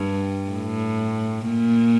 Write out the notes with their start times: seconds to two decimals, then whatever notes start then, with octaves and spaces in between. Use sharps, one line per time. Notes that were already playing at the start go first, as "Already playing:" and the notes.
Already playing: G2
0.50 A2
1.45 A#2